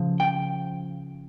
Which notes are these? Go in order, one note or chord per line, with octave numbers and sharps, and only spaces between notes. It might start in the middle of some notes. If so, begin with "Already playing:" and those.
Already playing: C#3 F3
G5